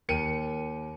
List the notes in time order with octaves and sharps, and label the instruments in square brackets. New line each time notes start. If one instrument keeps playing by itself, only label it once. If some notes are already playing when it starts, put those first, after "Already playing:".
[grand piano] D#2 A#4 G5 C#7 D#7